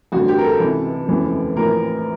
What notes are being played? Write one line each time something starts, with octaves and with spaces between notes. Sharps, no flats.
A1 G2 D3 F#4
G4
A#4
A4
C#2 C3 E3
F1 D#2 C#3 E3
A#1 A2 E3 A#4